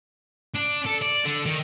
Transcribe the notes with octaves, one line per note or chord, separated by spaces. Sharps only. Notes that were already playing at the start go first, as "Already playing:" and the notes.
D4
A4
D5
D3
D#3